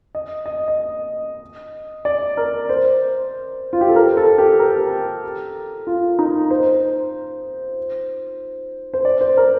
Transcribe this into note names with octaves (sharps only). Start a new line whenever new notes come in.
D#5
D#5
D#5
D5
A#4
C5
F4
G4
A4
A#4
A4
G4
A#4
F4
D#4
C5
C5
D5
C5
A#4